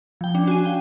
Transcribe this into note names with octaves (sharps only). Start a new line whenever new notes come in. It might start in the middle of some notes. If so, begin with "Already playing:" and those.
F3 G5
C#4 D4
F#4 G#5 D#7
F5 G5